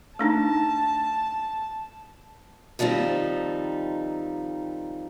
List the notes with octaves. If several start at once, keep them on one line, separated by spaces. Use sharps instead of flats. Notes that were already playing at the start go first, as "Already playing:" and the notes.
A3 D4 D#4 A5
D#3 F3 G3 C4 D#4